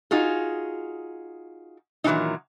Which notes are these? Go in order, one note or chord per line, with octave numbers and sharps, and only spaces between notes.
D#4 F4 F#4 G#4
A#2 D#3 E3 F#3 C#4 D#4